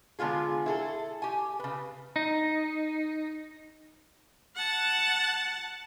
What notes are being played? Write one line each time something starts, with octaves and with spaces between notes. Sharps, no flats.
D3 G#3 B3 F4 G#4
E4 G#4 A4
G4 G#5
C#3 B4
D#4
F#5 A5